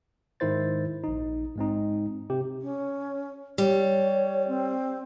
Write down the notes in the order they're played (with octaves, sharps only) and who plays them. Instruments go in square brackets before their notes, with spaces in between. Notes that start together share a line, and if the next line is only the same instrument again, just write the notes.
[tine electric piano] G#2 D#3 E4 C5 A6
A#1 D#4
G#2 G#3 C4 D#4
C3 G4
[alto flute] C#4
[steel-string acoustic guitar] G3 [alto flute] C#5
[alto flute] C4